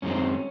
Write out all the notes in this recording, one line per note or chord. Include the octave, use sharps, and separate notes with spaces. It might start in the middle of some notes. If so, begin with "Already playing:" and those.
F#2 D#3 G#3 C4 C#4